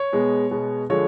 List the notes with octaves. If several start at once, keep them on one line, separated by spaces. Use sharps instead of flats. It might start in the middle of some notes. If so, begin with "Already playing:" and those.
Already playing: C#5
B2 G#3 B3
B2 G#3 B3
D3 F3 G#3 C#5